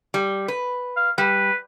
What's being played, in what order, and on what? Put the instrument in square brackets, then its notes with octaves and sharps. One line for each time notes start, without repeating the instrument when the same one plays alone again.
[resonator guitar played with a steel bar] G3
B4
[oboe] F5
[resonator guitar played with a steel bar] G3 [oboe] B4